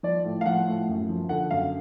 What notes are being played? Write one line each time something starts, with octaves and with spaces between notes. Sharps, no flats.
F3 D5
A2
F5
F3 F#5
A2
F#2
F3
D3 F#5
F#2 F5